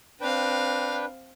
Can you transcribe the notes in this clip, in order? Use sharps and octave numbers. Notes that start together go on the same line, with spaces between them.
C4 D4 B4 F5 G5